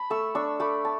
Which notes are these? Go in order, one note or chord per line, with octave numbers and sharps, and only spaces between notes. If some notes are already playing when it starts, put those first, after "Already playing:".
Already playing: A5 B5
A3 C#6 E6
D4 C#6 E6
A3 B5 D6
A5